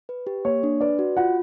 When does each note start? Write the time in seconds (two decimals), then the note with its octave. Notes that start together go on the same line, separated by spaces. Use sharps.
0.09 B4
0.27 G4
0.45 A#3 C#5
0.63 D4
0.81 B4 D5
0.99 F#4
1.17 F4 F#5